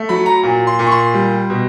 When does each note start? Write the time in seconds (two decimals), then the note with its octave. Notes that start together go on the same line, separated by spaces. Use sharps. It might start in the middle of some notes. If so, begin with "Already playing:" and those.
Already playing: A3
0.09 F#3 B5
0.26 A#5
0.43 A#2
0.67 C6
0.79 A#2
0.87 C#6
0.92 C6
1.14 G3
1.50 B2